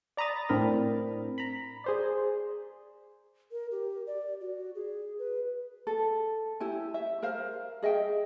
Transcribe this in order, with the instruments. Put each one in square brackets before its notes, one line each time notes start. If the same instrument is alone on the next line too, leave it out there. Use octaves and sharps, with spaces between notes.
[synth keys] D5 A#5 B5 D#6 A6
A2 C4 D4 A#4 B5
A#5 B5
G#4 C5 D5
[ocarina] A#4
G4
D5
F#4
G#4
B4
[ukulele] A4
E4 G4 G#5
E5
A#4 C5 F5
G#4 D#5 E5 G5